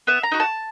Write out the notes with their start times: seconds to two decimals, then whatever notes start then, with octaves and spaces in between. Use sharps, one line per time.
0.07 B3 E5
0.23 A#5
0.32 D#4 F#4
0.40 A5